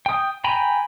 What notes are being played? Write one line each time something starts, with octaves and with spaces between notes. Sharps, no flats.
G5 D#6
G5 G#5 A#5 B5